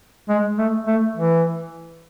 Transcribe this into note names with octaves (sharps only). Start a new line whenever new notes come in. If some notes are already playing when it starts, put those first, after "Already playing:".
G#3
A3
A3
E3